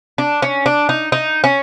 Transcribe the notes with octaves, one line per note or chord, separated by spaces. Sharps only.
D4
C#4
D4
D#4
D#4
C#4